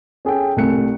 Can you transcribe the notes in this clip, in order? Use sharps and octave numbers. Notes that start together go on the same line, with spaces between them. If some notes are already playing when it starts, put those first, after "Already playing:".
C#4 G#4 A4 G5
C2 C3 A3 F#6 C#7